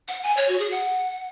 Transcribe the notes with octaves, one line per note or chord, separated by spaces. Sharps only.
F#5
G#5
C#5
F#4
G#4
F#5